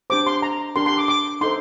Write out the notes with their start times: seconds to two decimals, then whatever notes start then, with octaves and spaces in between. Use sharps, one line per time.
0.10 D4 G4 C5 D6
0.27 C6
0.42 A#5
0.76 D4 G4 A#4 C6
0.86 C6
0.98 D6
1.08 D6
1.41 D#4 A4 C5 C6